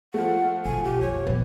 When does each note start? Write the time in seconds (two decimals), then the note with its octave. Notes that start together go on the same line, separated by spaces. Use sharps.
0.14 F3 A3 F#5
0.65 B1 G#5
0.84 G4
1.01 F2 C#5
1.27 A#1 E3 B3